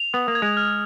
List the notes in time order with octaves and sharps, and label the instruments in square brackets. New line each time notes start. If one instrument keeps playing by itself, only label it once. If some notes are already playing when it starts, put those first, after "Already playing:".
Already playing: [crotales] F7
[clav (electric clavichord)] B3 [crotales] D#6
[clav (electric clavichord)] A#3
[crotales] G#6
[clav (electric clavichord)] G#3
[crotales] F6